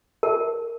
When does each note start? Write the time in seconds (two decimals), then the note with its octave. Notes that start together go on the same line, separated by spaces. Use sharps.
0.23 A#4